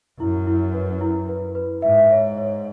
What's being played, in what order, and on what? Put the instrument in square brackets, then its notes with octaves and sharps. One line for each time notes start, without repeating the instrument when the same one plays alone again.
[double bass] F#2 [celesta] E4
[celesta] E4
B4
E4
B4
B4
[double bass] G#2 [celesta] E5
[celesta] C#5
C#5